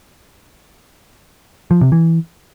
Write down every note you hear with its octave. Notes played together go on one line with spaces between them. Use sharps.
F3
C3
E3